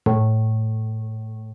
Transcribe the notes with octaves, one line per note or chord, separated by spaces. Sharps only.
A2